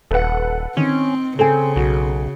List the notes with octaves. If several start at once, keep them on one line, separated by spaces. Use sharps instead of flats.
D#1 A4 B4 F#5
D#3 C4 C#4
C#3 C4 A4 G#5
B1 F#4